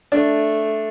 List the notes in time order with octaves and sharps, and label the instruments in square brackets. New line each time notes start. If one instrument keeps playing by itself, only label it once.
[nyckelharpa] A3 [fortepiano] D4